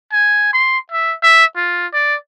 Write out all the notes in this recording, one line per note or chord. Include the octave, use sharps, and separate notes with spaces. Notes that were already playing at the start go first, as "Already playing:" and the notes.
G#5
C6
E5
E5
F4
D5